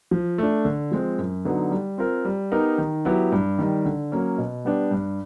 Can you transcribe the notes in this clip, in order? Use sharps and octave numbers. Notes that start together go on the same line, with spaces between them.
F3
A3 D4
D3
F3 G#3 C4
F#2
D3 F#3 B3 D#4
G3
C4 F4 A#4
G3
B3 D#4 G4 A#4
D#3
F#3 B3 E4 G4
G2
D#3 G3
D3
F#3 A#3 C#4
B2
G3 B3 D4 G4
G2